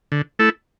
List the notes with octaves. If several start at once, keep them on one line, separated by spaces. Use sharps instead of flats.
D3
A3 E4 A4